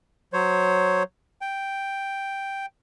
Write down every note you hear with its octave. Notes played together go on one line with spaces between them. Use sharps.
F#3 C5 C#5
G5